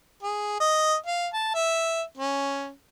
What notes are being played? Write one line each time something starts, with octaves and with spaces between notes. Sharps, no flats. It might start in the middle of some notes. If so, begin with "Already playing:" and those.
G#4
D#5
F5
A5
E5
C#4